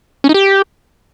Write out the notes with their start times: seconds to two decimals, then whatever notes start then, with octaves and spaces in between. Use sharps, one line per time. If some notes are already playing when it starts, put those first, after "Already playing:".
0.24 C#4
0.29 D#4
0.34 G4